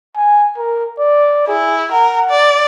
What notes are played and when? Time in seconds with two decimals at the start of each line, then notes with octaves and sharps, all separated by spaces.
0.16 G#5
0.57 A#4
0.99 D5
1.48 E4 G#4
1.92 A#4 F#5
2.30 D5